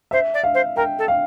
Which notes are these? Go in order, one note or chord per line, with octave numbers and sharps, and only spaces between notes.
C5 E5
D5
F5
C5
A#4 G5
A4
F5